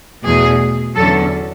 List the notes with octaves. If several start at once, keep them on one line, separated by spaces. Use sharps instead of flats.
E2 B2 A3 G#4
E2 D3 F#3 C#4 A4